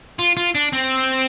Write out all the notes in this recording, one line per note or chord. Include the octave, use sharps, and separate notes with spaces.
F4
F4
D4
C4